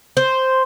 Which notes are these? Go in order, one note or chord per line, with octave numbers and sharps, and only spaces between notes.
C5